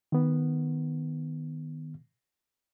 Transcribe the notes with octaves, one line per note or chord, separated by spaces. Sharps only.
D#3 B3